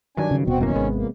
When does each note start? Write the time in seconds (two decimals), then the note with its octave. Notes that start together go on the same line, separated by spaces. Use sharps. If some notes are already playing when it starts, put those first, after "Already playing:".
0.17 G2 D#3 F#3 D4 G#5
0.31 C#3
0.47 D#1 B2 C4 F#4
0.61 F#2 D#3 E3 A#3 C#4
0.75 G#1 C3 G#3 B3
0.95 F2 A#3